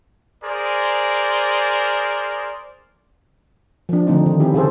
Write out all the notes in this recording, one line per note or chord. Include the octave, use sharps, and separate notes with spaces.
G#4 A#4 C5 D5
F3 D4
D3 F3 A3 C4 D#4
D#3
C4 C#4 E4 G4 G#4
C#3 G#4 A4 C5